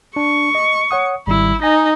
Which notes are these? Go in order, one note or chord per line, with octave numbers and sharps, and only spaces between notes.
D4 C#6
D#5
C#5 F#5 D#6
G#1 G3 E4
D#4 G#5 A#6